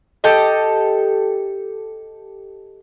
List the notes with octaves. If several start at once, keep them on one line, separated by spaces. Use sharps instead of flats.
G4 A4 D#5